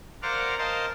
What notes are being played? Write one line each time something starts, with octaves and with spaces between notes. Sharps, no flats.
A#4 C5 D5 F5 F#5 A#5
A#4 C5 D#5 F5 A5